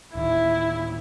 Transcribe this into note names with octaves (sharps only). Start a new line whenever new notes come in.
D1 D#3 E4